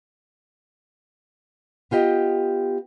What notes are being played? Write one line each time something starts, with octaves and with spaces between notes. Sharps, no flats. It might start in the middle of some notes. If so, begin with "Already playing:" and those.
B3 F4 G4 D#5 G5